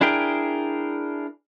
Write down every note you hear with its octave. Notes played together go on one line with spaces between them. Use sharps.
D4 E4 G#4 A#4 G5